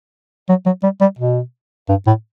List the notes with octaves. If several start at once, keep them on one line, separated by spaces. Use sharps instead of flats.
F#3
F#3
G3
G3
B2
G2
A2